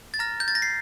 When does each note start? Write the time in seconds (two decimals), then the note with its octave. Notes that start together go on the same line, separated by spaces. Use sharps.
0.14 A6
0.19 A#5 F6 A#6
0.40 G6
0.48 A6
0.55 A#6
0.62 C7